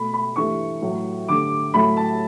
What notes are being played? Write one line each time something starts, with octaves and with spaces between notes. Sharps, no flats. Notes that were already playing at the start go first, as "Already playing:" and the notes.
Already playing: B2 A3 B5
B5
G2 E3 A3 C#6
A2 F#3 A3
G2 D3 A3 D6
A2 F#3 A3 B5
A5